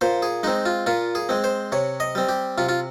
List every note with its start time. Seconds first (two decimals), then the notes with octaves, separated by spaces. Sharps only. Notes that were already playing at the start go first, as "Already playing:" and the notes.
0.01 A#2 C5
0.22 G#4
0.43 G#3 C4 D#4
0.66 F4
0.86 A#2 F4
1.15 G#4
1.29 G#3 C4
1.44 C5
1.72 C3 C#5
2.00 D#5
2.15 G3 C4
2.29 G4
2.58 C3 F4
2.69 F4